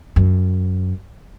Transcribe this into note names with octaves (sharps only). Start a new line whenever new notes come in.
F#2